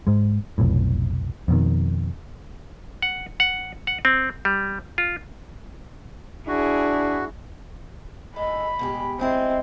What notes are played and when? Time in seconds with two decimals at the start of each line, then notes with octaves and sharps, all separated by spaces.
0.07 G#2 G#3
0.58 F1 B1 F2 A2
1.48 F2 B2 D#3
3.02 F#5
3.40 F#5
3.87 F#5
4.05 C4
4.45 G3
4.98 F4
6.48 D4 E4 F#4 G#4
8.36 G#3 D#4 A4 B5
8.79 B2 G#3 G4
9.19 G#3 C4 E4 D#5